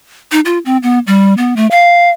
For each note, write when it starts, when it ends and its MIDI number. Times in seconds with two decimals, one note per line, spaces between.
0.32 0.40 63
0.45 0.58 65
0.65 0.77 60
0.83 0.99 59
1.07 1.34 55
1.38 1.54 59
1.56 1.67 57
1.71 2.09 77